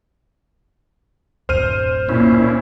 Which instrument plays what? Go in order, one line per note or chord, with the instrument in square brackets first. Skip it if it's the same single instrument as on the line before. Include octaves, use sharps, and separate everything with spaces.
[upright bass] D1 F#2 [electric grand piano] C5 F6 D#7
[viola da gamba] A#2 [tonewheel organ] C#4 E4